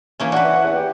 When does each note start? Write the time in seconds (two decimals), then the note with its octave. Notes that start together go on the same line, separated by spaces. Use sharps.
0.20 E3 A#3 C#4
0.32 D4 F#4 B4 F#5
0.45 E3
0.64 E2
0.76 G4